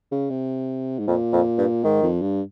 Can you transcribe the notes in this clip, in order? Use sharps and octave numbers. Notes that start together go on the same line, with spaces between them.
C#3
C3
G#2
F2 A#2
F2
G2
G#2 D#3
F2
G2